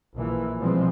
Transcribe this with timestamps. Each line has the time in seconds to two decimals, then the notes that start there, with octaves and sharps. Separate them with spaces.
0.16 A#1 A#2 E3
0.59 B2 E3 F3 G3 G#3 C4